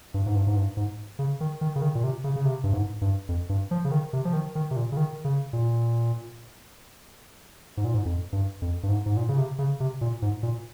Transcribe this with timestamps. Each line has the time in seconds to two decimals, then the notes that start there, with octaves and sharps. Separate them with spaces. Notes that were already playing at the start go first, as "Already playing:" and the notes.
0.14 G2
0.26 G#2
0.35 G2
0.47 G#2
0.56 G2
0.77 G#2
1.19 C#3
1.41 D#3
1.61 D#3
1.76 C#3
1.82 D#3
1.95 A#2
2.04 C3
2.24 C#3
2.36 C#3
2.45 C3
2.64 G2
2.73 G#2
3.01 G2
3.29 F2
3.49 G2
3.71 F3
3.85 C#3
3.91 D#3
4.13 C3
4.25 F3
4.33 D#3
4.55 D#3
4.71 C3
4.76 A#2
4.92 C#3
4.97 D#3
5.24 C#3
5.53 A#2
7.77 G#2
7.85 A#2
7.94 G#2
8.05 F2
8.33 G2
8.62 F2
8.83 G2
8.89 G#2
9.06 G#2
9.17 A#2
9.29 C#3
9.38 C3
9.59 C#3
9.80 C3
10.01 A#2
10.22 G#2
10.43 A#2